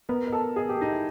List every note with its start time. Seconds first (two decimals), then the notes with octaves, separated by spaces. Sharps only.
0.09 B3 A#4
0.27 A#4
0.32 A4
0.56 G#4
0.69 G4
0.81 D#4
0.93 E4